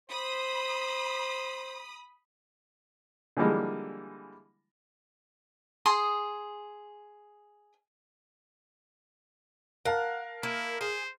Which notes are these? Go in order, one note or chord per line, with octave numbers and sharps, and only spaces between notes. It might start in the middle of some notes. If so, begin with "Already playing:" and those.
C5 B5 D#6
D3 E3 F3 G3 G#3 A#3
G#4 C6 D#6
A#4 F5 F#5 A5
A#3 E4
G#4 C5